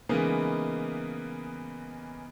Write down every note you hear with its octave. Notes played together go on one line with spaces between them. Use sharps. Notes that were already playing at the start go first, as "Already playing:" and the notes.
C#3 E3 G#3 A#3 B3 D#4